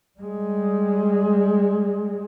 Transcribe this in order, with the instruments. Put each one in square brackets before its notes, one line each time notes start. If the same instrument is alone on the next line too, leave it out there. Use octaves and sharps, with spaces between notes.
[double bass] G3 G#3